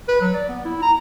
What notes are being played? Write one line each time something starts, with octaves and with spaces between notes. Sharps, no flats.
B4
F#3
D5
B3
E4
A#5